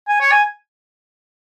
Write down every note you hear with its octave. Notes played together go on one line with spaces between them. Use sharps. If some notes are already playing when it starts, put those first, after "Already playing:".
G#5
C#5
G#5